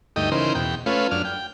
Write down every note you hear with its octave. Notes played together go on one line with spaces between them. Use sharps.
D2 G2 A3 D#4 D#5 G5
C#3 E3 D#4 A#4 C5
E2 B2 G5
A3 C#4 F4 B4
F#2 D4 F6
G5